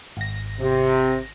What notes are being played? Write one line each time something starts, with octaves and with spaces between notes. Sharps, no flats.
G#1 A#6
C3